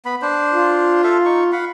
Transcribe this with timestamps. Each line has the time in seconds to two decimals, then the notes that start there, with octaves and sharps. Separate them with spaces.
0.05 B3 B5
0.22 D4 C5
0.54 F4
1.03 A4 E5 F5
1.25 D#4 C#6
1.52 F5 F#5 B5